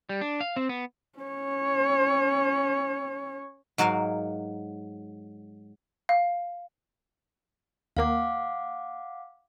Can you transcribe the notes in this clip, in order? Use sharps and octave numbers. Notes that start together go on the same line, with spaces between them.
G3
D4
F5
C4
B3
C#4 C#5
G#2 F#3 F#4 A#4 F5
F5
D#2 A#3 F5 F#5 D6